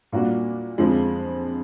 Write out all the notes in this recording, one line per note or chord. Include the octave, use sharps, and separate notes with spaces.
A#2 G3 A#3 D4 F#4
F2 D3 F3 G#3